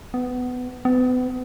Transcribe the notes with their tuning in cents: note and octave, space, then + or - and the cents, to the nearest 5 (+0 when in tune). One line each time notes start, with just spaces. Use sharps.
B3 +15
B3 +35